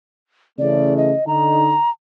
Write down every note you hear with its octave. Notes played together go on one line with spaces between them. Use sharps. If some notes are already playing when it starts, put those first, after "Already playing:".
C#3 E3 A3 D5
D#5
D3 D#4 A#5